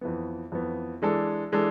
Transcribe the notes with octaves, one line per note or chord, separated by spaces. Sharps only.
F2 E3 B3
F2 E3 B3
E3 G#3 D4 A4
E3 G#3 D4 A4